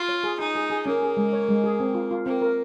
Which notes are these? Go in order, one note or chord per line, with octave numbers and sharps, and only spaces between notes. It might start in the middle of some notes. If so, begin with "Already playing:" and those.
Already playing: F4
C#5
G#4
D#4 G#4
G#4
G#4
A#3 C#4
G#4
G#3
C#5
G#3
G#4
C4
F4
F4
A#3 C4
A#4